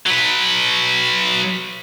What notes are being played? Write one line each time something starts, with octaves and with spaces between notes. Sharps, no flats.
F#3 B4